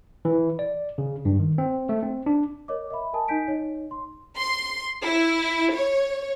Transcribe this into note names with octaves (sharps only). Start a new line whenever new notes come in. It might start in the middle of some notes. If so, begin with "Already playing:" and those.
E3
D5
C#3
G2
D#3
C4
A3
C4
D4
A#4 C#5 D#5 D6
D#5 E5 B5
A#4 D#5 G#5 A5 D#6
D#4 D#5 G#5 G6 B6 D7
D#4 C#5 D#5
C6
C6
E4
C#5